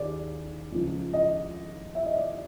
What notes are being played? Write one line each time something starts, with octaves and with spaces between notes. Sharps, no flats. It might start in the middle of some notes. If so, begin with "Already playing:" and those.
Already playing: D#2 C#3 G4 G#4 D5
C#2 C#3 F3
D#5
E5
D#5
D5